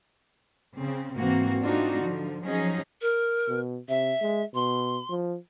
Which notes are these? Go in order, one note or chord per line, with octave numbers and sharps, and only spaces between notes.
C#3 C4
G#2 C3 E3 A#3 C4 F#4
A3 C4 D4 D#4 F4 F#4
D3 F3
F3 F#3 C#4 D#4 G#4
A#4
B2
C3 E5
G#3
B2 C6
F3